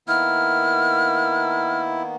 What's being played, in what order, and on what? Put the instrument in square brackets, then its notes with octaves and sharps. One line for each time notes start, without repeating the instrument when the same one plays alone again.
[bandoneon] D#3 A#3 B3 [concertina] E4 [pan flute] F6